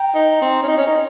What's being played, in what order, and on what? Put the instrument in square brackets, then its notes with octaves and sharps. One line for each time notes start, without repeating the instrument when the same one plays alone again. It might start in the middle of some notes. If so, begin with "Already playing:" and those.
Already playing: [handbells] G5 A#5
[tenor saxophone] D#4
C4
C#4
D#4
C#4
D#4